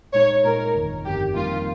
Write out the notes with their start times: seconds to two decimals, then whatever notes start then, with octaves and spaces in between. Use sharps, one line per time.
0.14 A#2 G#3 D#4 C#5
0.44 A#2 G#3 D#4 A#4
0.75 G1 F2 D#3
1.06 G1 F2 D#3 G4
1.36 F2 D#3 G3 A#3 F4